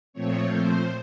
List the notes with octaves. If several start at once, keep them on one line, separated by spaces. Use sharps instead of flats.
A#2 F3 A3 C4 C#5
C5